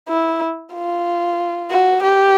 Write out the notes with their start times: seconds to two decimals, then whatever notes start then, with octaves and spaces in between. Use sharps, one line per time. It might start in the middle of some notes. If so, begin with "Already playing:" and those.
0.09 E4
0.73 F4
1.70 F#4
2.03 G4